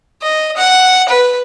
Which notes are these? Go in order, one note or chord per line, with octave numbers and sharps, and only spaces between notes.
D#5
F#5
B4